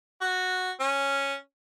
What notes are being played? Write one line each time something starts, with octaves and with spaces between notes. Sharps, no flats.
F#4
C#4